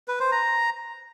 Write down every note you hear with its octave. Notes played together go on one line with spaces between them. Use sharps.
B4
C5
A#5